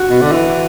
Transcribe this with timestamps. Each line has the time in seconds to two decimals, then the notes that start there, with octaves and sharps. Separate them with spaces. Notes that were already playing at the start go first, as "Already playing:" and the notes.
Already playing: F#4
0.10 B2
0.22 D3
0.32 E3